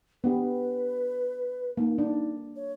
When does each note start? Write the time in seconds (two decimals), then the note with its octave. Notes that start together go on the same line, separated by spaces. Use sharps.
0.24 B3 D4 G4 B4
1.77 A#3 D#4
1.98 D4
2.56 C#5